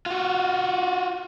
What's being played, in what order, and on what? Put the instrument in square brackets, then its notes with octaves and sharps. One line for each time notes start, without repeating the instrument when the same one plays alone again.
[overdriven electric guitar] F4 F#4